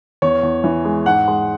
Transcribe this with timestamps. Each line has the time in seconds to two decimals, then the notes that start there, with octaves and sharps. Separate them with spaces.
0.22 E2 C#5
0.43 E2
0.64 E3
0.85 G#3
1.06 G#2 F#5
1.28 G#3